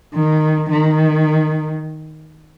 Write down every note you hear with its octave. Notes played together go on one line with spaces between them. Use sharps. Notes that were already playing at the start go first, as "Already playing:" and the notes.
D#3
D#3